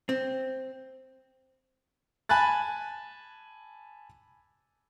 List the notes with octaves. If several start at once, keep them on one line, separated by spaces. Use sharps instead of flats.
C4
G#5 A5 B5 F#6 A6